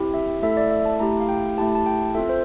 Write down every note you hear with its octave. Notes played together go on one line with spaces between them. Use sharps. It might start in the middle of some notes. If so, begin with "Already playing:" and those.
Already playing: C4 E4 G4
E5
A3 E4 A4 E5
D5
E5
A5
A3 E4 G4 A#5
F5
G5
A3 E4 G4 A5
A5
G5
C4 F4 A4 E5
C5